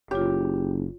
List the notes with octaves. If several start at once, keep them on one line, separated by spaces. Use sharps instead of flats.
F#1 F4 G4 C#5